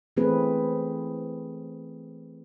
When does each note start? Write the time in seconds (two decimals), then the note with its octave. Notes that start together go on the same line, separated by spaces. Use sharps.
0.17 E3 A3 C4 G#4 B4